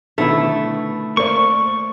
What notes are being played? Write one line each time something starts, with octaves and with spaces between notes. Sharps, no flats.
B2 D3 D#3 A3 E4
A#3 C5 D5 C#6